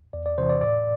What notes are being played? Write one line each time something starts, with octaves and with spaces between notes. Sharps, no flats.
E2 D5
D5
C3 E3 C5
D5
A2 D5